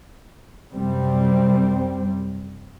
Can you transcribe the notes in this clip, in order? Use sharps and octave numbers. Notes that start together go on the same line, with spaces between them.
F#2 C3 G3 C4